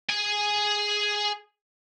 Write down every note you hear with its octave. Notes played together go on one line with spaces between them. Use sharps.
G#4 G#5